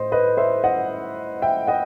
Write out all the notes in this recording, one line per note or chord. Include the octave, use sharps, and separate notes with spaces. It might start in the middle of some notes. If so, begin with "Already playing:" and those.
Already playing: A2 C5 D#5
B4 D#5
C5 E5
D#5 F#5
E5 G5
D#5 F#5